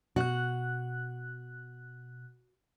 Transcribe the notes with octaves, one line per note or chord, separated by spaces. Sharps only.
B2 F#4 F#6